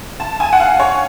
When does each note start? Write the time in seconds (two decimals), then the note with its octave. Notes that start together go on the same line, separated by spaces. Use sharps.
0.20 A5
0.40 G#5
0.53 F#5
0.60 F5
0.80 C#5